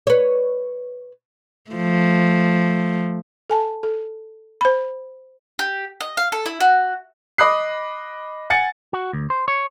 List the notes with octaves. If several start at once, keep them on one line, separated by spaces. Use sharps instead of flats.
B4 C#5
F3 A3
A4 G#5 A5
A4
C5 B5
G4
D#5
F5
A4
E4
F#4
D#5 B5 D6 D#6 F#6 C7
F#5 G#5 A6 C#7
F#4
D2
C5
C#5